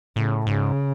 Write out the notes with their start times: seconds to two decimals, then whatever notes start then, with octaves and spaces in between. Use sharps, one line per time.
0.16 A2 C#3
0.46 G#2 C#3